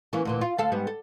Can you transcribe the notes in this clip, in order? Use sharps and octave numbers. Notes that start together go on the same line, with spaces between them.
E3 A#3 C#4
D2 A#2 E3
F4
D2 A4 F5
G#2 G3 B3
A4